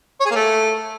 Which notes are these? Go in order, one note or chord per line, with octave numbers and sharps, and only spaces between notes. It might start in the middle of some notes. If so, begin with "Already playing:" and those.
C#5
G#4
A#3
A3